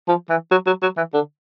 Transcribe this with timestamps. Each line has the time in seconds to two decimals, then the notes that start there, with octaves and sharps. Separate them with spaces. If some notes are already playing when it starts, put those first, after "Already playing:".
0.08 F3
0.30 E3
0.51 F#3
0.67 F#3
0.83 F#3
0.97 E3
1.14 D3